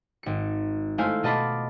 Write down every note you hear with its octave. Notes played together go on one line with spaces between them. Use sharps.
G#1 C#7
G#3 A3 E4 C5 F5 G#5
B2 F4 D#5 A5 B5 D6